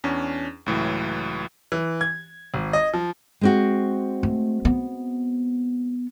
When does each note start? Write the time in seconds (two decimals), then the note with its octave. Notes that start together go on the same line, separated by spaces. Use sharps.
0.04 E2 C#4 D4
0.66 C#2 A2 E3 F#3
1.72 E3
2.01 G#6
2.54 G#1
2.73 D#5
2.93 F3
3.41 G#3 C4 F#4
4.23 A3
4.65 B3